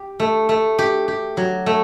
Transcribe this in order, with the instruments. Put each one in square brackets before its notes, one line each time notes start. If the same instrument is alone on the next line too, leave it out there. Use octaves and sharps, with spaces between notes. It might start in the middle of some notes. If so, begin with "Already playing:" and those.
Already playing: [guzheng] G4
A3
A3
G4
G4
F#3
A3